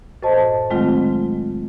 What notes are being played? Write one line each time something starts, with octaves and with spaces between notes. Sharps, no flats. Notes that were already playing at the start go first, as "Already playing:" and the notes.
F#2 A2 C5 D#5 A5
D#3 F#3 G#3 A3 C4 F4